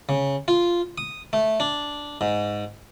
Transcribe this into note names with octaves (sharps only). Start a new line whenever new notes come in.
C#3
F4
D#6
A3
D4
G#2